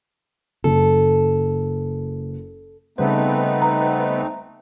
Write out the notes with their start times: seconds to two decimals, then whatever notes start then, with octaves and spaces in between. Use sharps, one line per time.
0.64 F#1 A4
2.98 C#3 G3 A3 B3 C4 D#4 B4 C5
3.62 A#5